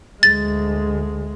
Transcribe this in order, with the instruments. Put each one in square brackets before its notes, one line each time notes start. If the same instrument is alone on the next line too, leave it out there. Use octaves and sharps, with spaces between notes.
[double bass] D2 G#3 [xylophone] A6